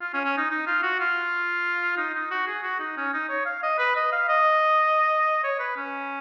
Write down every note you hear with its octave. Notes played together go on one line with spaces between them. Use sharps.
F4
C#4
C#4
D#4
D#4
F4
F#4
F4
D#4
D#4
F#4
G#4
F#4
D#4
C#4
D#4
C#5
F5
D#5
B4
D#5
F5
D#5
C#5
B4
C#4